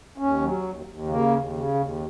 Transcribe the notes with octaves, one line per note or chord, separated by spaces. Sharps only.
D#2 C#4
F#3
D#2
D#2
C#3 A#3
D#2
C#3
D#2